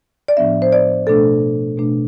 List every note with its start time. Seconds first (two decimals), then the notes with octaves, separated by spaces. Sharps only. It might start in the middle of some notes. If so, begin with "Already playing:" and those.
0.28 D5
0.37 A2 F3 B3 D4 E5
0.62 C5
0.72 D5
1.07 B2 A3 D4 A4
1.78 B2 A3 D4